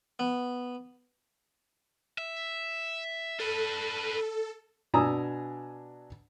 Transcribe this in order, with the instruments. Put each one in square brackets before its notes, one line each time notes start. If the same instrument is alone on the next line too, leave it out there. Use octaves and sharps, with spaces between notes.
[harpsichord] B3
[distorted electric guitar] E5
[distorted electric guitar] D4 B4 [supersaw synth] A4
[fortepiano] B2 D4 G#5 A#5 D#6 E6